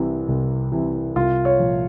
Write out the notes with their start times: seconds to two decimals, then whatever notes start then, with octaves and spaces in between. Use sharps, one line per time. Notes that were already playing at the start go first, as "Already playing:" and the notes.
Already playing: C2 C3 E3
0.28 C2
0.72 C3 E3
1.16 C2 F4
1.45 C#5
1.59 A#2 F3